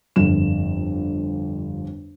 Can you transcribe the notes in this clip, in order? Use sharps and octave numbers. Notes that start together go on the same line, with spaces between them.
G1 F2 E7